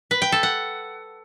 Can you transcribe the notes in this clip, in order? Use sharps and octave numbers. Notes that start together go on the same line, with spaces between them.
B4
G5
A4
F#5